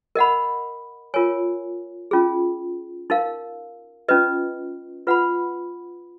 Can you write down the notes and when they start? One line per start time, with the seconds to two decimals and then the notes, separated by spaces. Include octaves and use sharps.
0.15 A#4 D#5 F#5 B5
1.14 F4 A#4 C#5 G#5
2.11 C#4 F4 G#4
3.10 D#4 A#4 F5
4.08 C#4 F4 B4 D#5
5.07 F4 B4 F#5 B5